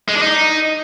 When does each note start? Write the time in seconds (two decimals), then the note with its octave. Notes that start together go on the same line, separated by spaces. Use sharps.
0.09 G#3
0.15 D4
0.22 D#4